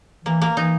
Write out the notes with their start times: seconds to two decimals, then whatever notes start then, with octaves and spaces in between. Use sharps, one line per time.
0.25 E3 A#3
0.42 A#3
0.56 E3 D#4